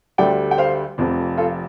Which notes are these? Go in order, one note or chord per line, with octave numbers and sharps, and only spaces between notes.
D2 D3 G3 D5 G5
G5
C5 F5
F1 F2 F3
F4 A4